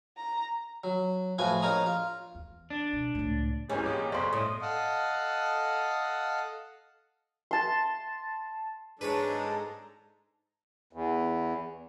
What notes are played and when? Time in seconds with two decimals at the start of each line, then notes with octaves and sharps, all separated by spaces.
0.17 A#5
0.84 F#3
1.38 A2 F3 F#4 B4 G#5
1.62 A#1 D#4 A#4 C#5 A#5 D#6
1.86 F4
2.35 E2
2.70 D4
2.93 B2
3.15 C#2 A2
3.70 G#1 E3 G3 G#3 C#4 D#4
3.84 A#2 G4 D6
4.12 B1 F2 C#3 D5 C6
4.33 A2 D#5 D#6
4.62 A4 D#5 F5 F#5
7.51 A5 C6
9.01 G#2 G#3 D4 A4 B4 C#5 A#5
10.93 E2